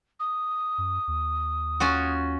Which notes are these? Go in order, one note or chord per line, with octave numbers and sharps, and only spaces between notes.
D#6
F#2
D#2
C#4 F4 F#4